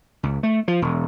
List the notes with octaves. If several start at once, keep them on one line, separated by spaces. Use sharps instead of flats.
C#2
A3
F3
E1